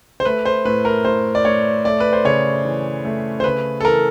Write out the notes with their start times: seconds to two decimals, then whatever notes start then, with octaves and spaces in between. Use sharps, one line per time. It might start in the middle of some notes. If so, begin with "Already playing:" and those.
0.20 C5
0.25 A3 B4
0.45 C5
0.65 A2 B4
0.85 A#4
1.05 A2 C5
1.35 D5
1.45 A2 C#5
1.85 A3 D5
2.00 B4
2.13 C5
2.25 C#3 C#5
2.65 E3
3.05 A3
3.40 C5
3.44 C#3 B4
3.80 A4
3.84 E3 A#4